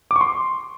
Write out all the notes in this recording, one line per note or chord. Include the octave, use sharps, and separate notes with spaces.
D6
C#6
C6